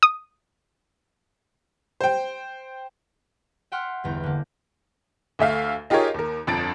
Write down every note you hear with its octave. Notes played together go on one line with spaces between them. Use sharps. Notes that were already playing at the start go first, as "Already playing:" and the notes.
D#6
C5 G5
E5 F#5 G5 C6 F6 F#6
G1 E2 A#5 G6
D3 A#3
D2 A3 E5 F5
D#4 F4 G4 G#4 A#4 C#5
D#2 A#4
G1 F2 A5 A6 D7